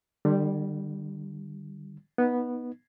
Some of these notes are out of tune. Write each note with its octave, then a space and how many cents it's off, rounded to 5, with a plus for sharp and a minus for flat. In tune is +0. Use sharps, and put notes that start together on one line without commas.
D3 +40 G3 +0
B3 -10 D#4 +0